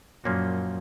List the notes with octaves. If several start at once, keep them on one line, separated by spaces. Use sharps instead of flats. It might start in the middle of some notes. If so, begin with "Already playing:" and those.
F#2 A#2 F3 A#3 C#4 F#4